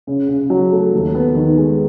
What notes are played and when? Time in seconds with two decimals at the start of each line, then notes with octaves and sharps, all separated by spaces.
0.07 C#3
0.29 C#3
0.50 F#3
0.72 A3
0.94 D#2
1.15 B3
1.35 D#3
1.57 G#3